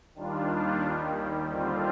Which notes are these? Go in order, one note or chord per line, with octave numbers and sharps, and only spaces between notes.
D#2 D#3 G3 D4 F4
D#2 D#3 G3
D#2 D3 G3 C4 F4